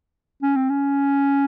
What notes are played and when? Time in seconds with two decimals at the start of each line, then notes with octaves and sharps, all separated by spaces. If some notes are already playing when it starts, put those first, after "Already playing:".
0.42 C#4
0.56 C4
0.69 C#4